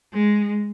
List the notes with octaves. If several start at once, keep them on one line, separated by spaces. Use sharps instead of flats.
G#3